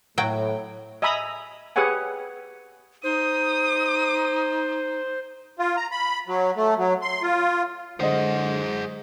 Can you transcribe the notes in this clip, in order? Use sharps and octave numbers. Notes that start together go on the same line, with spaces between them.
A2 F#3 G5
D#5 E5 G#5 A#5 B5 D#6
G4 G#4 B4 C#5 F#5 G#5
D#4 C5 D#6
F4
A#5
B5
F#3
A3
F#3
C6
F4
D3 F#3 G#3 G#4 C5 D#5 F#5